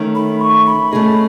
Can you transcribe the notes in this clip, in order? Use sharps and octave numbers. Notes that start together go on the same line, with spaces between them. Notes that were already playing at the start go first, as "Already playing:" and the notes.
Already playing: D#3 A3 C#4
B5
C#6
B5
A3 C#4 G#4 D#5